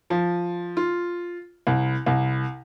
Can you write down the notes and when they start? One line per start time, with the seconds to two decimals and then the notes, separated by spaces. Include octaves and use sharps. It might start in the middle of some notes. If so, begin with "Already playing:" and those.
0.10 F3
0.77 F4
1.67 C2
2.06 C2